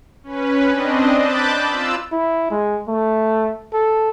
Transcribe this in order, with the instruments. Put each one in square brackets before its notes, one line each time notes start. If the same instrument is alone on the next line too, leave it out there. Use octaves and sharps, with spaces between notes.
[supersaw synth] C#4 B4
C4 D4 D#5
A5 B5 D6 F#6 G6 A6
F4 E6
[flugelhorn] E4
G#3
A3
A4